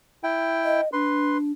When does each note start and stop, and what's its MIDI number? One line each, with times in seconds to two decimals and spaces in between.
0.23 0.81 64
0.23 0.81 79
0.65 0.89 75
0.93 1.52 62
0.93 1.37 71
0.93 1.37 84